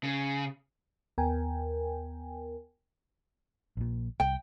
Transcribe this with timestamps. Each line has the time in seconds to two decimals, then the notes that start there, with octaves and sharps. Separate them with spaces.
0.04 C#3
1.18 D#2 B3 A#4 G5 G#5
3.77 A#1 A#2
4.20 C2 G5